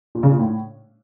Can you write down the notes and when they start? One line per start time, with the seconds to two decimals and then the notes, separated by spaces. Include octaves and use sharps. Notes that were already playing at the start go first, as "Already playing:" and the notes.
0.15 A#2
0.23 C#3
0.31 A#2
0.39 A2